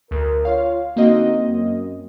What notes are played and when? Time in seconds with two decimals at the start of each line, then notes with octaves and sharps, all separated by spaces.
0.11 D2 A#4
0.45 F4 C#5 F5
0.96 D3 A#3 C4 D#4 F#4 D#5
1.48 F#2